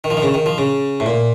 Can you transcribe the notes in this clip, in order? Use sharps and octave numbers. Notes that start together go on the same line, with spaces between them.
D#3
F3
D#3
C#3
D#3
F3
C#3
A2
A#2